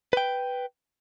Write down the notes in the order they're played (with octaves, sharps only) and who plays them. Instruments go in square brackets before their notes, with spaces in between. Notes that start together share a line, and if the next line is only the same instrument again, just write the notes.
[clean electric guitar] B4 G5